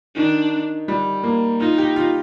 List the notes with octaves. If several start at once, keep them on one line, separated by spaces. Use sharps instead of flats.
D#3 D4
G3
A#3
D#4 F4
G4
F4